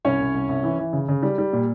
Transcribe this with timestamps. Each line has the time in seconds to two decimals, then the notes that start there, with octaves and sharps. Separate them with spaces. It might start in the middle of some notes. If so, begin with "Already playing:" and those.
0.05 C2 C#4 C#5
0.20 C2
0.34 C2
0.49 C2
0.63 E3
0.79 E3
0.93 C#3
1.08 C#3
1.23 G3
1.38 G3
1.53 A#2